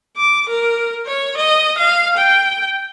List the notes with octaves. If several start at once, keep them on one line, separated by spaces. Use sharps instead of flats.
D6
A#4
C#5
D#5
F5
G5